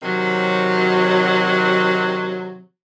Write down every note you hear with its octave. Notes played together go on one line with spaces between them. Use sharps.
C3 D#3 F#3